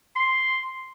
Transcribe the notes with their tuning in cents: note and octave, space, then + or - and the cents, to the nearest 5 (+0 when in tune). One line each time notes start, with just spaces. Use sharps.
C6 +0